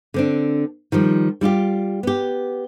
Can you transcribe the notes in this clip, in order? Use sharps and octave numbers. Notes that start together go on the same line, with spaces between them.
D3 C4 D4
D#3 F3 G3
G3 E4 F4 G4
B3 G4